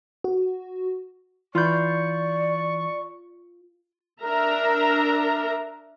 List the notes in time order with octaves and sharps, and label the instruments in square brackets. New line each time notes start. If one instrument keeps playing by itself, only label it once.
[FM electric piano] F#4
[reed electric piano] E3 [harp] F4 B5 G6 [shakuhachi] D5 [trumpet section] C#6
[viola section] D4 A#4 E5 A#5